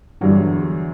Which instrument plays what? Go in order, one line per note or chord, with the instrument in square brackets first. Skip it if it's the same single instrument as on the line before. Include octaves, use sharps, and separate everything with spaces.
[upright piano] E2 D3 F#3 [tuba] G2